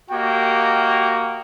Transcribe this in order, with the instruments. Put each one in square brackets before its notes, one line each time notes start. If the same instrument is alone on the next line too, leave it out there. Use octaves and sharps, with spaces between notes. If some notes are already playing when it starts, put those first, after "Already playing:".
[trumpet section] A#3 F#4 G4 D#5 G5